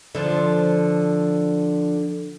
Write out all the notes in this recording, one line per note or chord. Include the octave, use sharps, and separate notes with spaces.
D3 F3